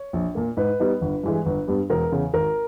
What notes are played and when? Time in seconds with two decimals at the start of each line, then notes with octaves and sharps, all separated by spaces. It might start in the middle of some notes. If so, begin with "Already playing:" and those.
Already playing: C#5
0.13 A#1
0.35 A#2 A#3
0.57 G#2 B4
0.80 G3 B3 D#4
1.01 G1
1.23 G2 E3 G#3
1.46 G1
1.68 G2 G3 B3
1.90 E1 A#4
2.12 E2 C#3
2.33 G#1 A#4